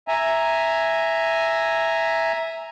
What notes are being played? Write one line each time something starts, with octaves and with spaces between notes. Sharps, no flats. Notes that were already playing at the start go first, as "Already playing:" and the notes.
E5 G#5 A#5